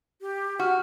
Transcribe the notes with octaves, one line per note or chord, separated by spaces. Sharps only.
G4
F#4 F6